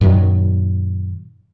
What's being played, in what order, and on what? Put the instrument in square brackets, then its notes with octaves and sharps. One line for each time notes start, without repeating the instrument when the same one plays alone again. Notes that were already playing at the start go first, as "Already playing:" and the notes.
[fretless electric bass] F#2 A#2 D#3 F#3